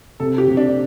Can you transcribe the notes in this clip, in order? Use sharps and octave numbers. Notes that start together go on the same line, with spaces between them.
C3 A4
G4
C3
D4